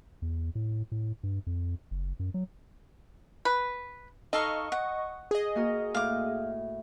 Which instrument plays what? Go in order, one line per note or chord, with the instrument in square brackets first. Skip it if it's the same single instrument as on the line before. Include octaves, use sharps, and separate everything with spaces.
[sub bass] E2
A2
A2
G2
F2
F#1
F#2
F#3
[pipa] B4
[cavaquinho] D#4 A4 F5 [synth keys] D#5 C#6
[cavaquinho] F#5
[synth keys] G#4 D#5
[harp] A#3 F#4 A#4
[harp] A2 [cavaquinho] F5 D6